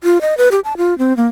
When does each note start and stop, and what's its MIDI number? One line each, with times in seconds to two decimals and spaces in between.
0.04 0.21 65
0.21 0.37 75
0.38 0.49 71
0.51 0.60 67
0.64 0.77 81
0.77 0.97 65
0.98 1.15 60
1.17 1.27 58